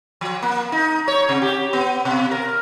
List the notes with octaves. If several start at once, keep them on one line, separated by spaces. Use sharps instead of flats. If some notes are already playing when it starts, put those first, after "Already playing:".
F3
A#3
D#4
C#5
C3
G4
B3
B2
A#4